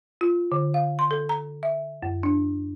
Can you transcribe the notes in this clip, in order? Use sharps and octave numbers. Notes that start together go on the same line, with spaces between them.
F4
D3
F5
C6
A4
A#5
E5
F#2
D4